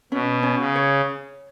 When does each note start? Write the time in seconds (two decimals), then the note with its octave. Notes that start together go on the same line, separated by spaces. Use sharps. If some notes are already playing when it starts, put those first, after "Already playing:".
0.12 B2 C#4
0.43 C#4
0.59 C#3
0.76 C#5